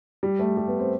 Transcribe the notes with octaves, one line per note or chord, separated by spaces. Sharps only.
G3
A3
G3
B3
C4